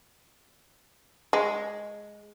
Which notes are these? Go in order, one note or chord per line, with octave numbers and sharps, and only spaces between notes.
G#3